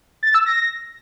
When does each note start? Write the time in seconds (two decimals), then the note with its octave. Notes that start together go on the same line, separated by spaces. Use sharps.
0.23 A6
0.35 E6
0.46 A#6